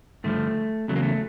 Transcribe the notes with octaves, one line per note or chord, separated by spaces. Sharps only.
G2 D3 F3 A3
E2 C#3 F#3 A3
A#3
A3